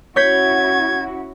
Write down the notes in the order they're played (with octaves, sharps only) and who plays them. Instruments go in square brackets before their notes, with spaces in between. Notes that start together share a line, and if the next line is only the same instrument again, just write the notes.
[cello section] C#4 E4 F#4 [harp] C#5 G6 B6 [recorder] G#6